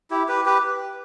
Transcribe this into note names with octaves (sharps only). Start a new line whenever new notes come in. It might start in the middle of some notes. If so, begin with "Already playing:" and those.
E4 G4
G4 B4
G4 B4